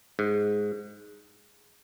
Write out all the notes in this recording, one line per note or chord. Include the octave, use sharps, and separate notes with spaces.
G#2